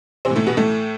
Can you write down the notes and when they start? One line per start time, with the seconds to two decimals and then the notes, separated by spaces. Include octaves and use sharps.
0.25 A2 C3 E3 C4
0.36 A2 A3
0.46 B2 B3
0.57 A2 A3